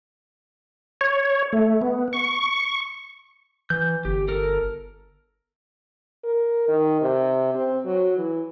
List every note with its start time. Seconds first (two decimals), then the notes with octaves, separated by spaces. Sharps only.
1.01 C#5
1.53 A3
1.81 B3
2.13 C#6
3.70 E3 G6
4.05 G1 G4
4.28 A4 A#4
6.24 A#4
6.68 D#3
7.01 C3
7.54 C4
7.85 F#3
8.17 E3